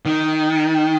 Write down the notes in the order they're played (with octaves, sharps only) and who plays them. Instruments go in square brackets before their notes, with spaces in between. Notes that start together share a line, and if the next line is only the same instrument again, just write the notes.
[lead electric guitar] D#3